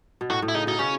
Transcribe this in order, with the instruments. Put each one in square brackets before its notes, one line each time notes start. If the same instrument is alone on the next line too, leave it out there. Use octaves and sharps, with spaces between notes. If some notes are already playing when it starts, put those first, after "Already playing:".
[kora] B2
[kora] A2 [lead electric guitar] F#4
[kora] A2
[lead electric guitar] E4
[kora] C#3 [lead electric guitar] D#4
[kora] B2 [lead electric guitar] D#4
[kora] C#3 [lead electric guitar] C#4